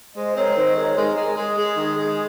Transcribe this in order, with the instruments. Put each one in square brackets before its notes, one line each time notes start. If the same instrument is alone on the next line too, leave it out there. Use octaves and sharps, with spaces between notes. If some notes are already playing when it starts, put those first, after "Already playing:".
[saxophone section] G#3 [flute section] C5 D#5
[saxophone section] C4 [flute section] A#4 C#5
[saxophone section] D#3 [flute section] C5 D#5
[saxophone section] G#3 [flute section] A#4 C#5
[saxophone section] G#3 [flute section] A#4
[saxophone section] G#3
[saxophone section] G#3 [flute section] G#4
[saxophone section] G#3
D#3
G#3